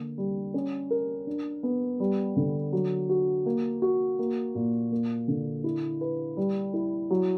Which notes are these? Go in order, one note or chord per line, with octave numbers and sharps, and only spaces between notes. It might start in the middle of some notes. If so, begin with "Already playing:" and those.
Already playing: D3 A#3
G3
C#4
A#4
D4
B3
G3
D3
F#3
F#4
A#3
F#4
A#3
A#2
A#3
D3
E4
B4
G3
E4
F#3